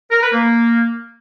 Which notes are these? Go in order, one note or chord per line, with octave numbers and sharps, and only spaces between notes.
A#4
B4
A#3